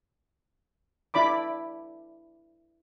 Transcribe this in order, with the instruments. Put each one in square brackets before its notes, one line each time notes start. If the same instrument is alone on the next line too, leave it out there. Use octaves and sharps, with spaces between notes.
[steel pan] D4 E4 D5 B5 D6